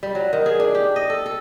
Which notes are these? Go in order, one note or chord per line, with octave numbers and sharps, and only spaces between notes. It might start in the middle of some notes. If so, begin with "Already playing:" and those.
G3
F#3
D#3
G#4
D4
G4
D#5
A4
A4